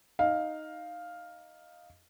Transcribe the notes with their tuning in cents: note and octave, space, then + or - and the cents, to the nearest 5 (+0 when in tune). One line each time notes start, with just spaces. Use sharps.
D#4 +0 F5 +5